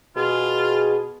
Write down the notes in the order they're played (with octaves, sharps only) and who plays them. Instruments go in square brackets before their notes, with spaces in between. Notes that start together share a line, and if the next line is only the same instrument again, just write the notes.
[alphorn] B2 [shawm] F4 [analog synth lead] G#4